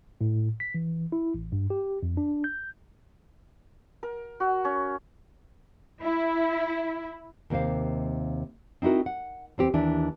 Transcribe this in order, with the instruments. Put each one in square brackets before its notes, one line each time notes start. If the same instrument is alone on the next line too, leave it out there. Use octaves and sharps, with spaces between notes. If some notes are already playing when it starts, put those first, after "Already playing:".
[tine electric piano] A2
B6
E3
E4
A1
G2
G4
F2
D4
G6
[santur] A#4
F#4
C#4
[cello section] E4
[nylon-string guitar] D#2 C3 A#3 C5 F5
C4 D#4 E4 F#4 A#4
F#5
E2 C4 G4
D#2 E3 D4 G4 E5